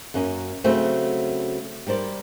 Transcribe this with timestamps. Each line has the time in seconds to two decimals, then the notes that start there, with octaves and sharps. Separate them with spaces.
0.14 F#2 A#3 C#4
0.64 C#3 F#3 A3 C4 F#4 C5
1.87 G3 A#3 C5 D5